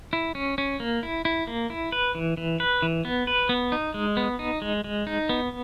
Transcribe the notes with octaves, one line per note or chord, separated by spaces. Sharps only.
E4
C#4
C#4
A#3
E4
E4
A#3
E4
B4
E3
E3
B4
E3
B3
B4
B3
D#4
G#3
B3
D#4
G#3
G#3
D#4
B3